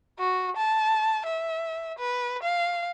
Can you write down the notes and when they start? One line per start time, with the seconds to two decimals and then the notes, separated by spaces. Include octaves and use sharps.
0.20 F#4
0.57 A5
1.26 E5
1.99 B4
2.43 F5